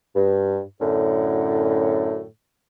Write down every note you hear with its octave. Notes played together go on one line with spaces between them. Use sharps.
G2
F#2 A2 D3